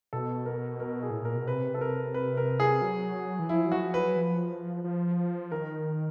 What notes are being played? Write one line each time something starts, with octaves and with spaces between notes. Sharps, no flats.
B2 A4
A#4
A#4
G#4
A2
A#2 A#4
B2
C3 B4
A4
A#4
B4
A#4
G#4
F#3
E3
F3 E4
F#3
F#4
F3
B4
F#3
F3
F3
D#3 A#4